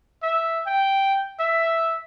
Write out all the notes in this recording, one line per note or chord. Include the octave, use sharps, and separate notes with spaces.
E5
G5
E5